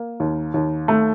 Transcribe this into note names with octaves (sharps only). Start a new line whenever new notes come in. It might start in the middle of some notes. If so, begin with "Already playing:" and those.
Already playing: A#3
D#2
D#2
A3